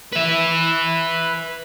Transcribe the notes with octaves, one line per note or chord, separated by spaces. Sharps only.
B4 E5